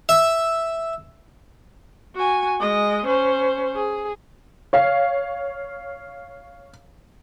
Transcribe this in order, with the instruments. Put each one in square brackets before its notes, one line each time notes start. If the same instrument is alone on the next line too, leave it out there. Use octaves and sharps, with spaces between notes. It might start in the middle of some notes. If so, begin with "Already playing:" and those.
[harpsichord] E5
[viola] F#4 G#5
G#3 D#5
C#4 C5
G#4
[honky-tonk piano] C#5 F5